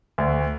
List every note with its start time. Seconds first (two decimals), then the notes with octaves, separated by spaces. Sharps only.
0.18 D2